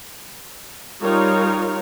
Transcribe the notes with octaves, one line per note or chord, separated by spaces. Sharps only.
G3 D#4 F4 A#4 C#5